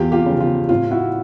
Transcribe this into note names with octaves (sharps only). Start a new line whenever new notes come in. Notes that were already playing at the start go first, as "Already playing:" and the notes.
Already playing: E2 F4 G4
F4 G4
C#3 F3
F4
A2 F4
E4 F#4